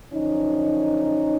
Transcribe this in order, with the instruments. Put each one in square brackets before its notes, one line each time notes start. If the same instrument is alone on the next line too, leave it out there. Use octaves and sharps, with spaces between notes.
[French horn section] F#2 D3 F3 C#4 D#4